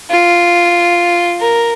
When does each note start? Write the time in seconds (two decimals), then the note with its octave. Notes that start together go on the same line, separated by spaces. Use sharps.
0.11 F4
1.41 A#4